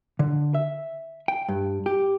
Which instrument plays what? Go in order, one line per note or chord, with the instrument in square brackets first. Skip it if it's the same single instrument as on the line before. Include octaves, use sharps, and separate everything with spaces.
[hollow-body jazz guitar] D3
E5
G5
G2
G4